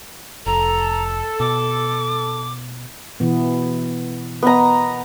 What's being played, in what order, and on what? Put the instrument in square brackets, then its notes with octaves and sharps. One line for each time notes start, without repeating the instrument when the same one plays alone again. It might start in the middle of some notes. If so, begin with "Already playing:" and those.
[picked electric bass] F1 [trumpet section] A4 [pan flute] A#5
[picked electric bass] B2 [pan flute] D6
[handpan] B2 E3 B3
[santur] B3 D#5 A#5